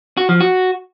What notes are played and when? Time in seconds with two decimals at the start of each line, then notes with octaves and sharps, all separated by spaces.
0.17 F#4
0.29 F3
0.40 F#4